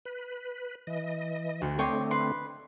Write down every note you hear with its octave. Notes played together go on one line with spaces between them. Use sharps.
B4
E3 D#5
D2 F#4
D3 A3 C4 C#5 D#5 G5 C6 D6
B4 C6